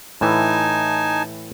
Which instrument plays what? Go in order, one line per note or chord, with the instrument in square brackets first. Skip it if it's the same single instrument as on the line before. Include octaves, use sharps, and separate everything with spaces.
[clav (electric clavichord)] A2 E3 [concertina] D#4 G#5 A5